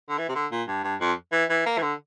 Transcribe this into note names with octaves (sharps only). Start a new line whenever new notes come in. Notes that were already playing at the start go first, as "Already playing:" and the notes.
D3
E3
C3
D3
A#2
G2
G2
F2
E3
E3
A#3
E3
D3